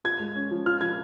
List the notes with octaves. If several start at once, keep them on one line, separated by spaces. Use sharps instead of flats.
F4 G#6
G#3
C#4
F3
F4 F6
F3 G#6